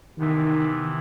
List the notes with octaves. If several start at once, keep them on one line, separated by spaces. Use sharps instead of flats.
C3 D#3 E3 B3 E4